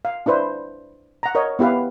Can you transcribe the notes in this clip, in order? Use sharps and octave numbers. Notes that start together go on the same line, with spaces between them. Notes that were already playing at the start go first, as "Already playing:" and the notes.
F5
D4 E4 B4 C5
F#5 A#5
A#4 C#5 D#5
B3 E4 G4 B4 F5